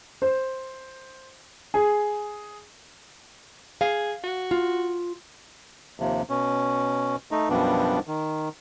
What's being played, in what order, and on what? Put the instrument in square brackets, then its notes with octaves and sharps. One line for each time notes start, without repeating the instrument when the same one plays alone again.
[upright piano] C5
G#4
[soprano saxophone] G#4 [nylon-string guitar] F5
[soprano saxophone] F#4
[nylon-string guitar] F4
[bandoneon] D#2 C3 F3
B2 C#4
A3 D#4
F#2 B2 F3 G3 B3 D4
D#3